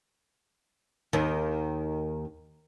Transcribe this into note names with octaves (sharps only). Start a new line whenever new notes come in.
D#2 D#3